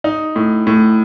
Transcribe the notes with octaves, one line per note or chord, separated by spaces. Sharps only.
D#4
A2
A2